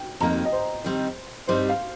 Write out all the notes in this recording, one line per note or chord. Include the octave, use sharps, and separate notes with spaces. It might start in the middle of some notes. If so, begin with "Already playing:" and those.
Already playing: G5
F2 D#3 A#3 D#4 A#5
D#5
C5
D#3 G3 C4 D#4
G2 G3 C4 D#4 C5
F5